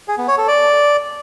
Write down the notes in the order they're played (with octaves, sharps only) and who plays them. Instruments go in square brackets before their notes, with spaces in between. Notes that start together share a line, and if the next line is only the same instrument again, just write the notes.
[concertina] G#4
B3
C#5
A4
D5